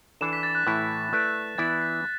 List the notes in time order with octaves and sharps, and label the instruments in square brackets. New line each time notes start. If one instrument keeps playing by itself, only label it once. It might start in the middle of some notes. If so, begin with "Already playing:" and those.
[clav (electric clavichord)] E3 D4 A4 [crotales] E7
[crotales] B6
A6
F#6
[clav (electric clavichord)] A2 E3 A3 E4
[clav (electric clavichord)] A3 E4 B4 D5 [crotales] F#6
[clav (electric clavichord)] E3 B3 E4 D5 [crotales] A6
[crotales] B6